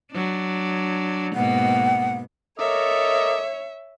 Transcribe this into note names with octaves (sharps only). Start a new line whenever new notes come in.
F#3 D4
G#2 B2 A#3 F#5
A4 A#4 C#5 D#5 E5 D6